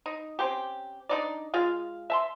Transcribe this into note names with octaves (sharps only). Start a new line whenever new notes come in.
D#4
C4 C#4 G4
D4 D#4 D5
G#3 F4 F5
E5 A5 C6